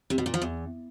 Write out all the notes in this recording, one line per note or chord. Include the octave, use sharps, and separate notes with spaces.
C3
B2
A#2
F3
E2